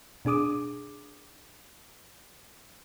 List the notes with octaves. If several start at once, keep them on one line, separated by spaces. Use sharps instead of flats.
B2 D4 G#4 D6 D#6